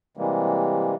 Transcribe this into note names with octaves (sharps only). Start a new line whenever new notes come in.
C3 E3 G3 G#3 A#3